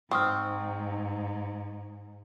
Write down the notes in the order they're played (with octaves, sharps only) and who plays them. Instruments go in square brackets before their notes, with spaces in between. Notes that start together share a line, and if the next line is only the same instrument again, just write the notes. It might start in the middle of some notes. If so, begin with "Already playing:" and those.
[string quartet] G#2 [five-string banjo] C4 [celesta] C#6 D#6 F6